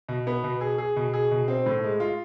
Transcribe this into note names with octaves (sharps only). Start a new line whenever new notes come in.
B2
B3
B2
G#4
G#4
B2
G#4
B2
C4
A2
G#3
F4